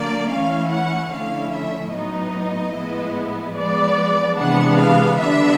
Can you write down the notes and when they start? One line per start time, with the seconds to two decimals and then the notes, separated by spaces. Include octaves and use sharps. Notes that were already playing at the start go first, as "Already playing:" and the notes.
Already playing: D3 F#3 A#3 D5
0.30 E3 A3 C#4 E4 F5
0.70 F#5
1.11 D3 F3 A3 C#4 E4 F5
1.52 E5
1.93 A2 F#3 B3 D#4 D#5
2.74 A2 F3 G#3 B3 E4
3.56 F3 G#3 B3 D5
4.37 C3 E3 G#3 B3 D4 F#5
4.78 F5
5.18 D3 G3 B3 D4 E5